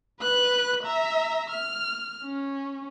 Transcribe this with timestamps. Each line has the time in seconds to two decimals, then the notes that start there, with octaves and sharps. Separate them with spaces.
0.22 B4 F#6
0.84 E5 A#5
1.51 F6
2.25 C#4